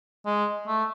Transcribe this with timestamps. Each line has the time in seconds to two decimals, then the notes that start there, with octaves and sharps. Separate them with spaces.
0.26 G#3
0.68 A3